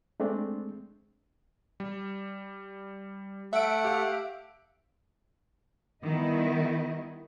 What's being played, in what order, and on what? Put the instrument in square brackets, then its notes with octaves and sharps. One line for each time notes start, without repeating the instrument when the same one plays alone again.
[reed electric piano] G#3 A3 C4 D4
[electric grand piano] G3
[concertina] A3 F#5 [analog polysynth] E5 D7
[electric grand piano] G4 F5
[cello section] D#3 G3 B3 E4 D#5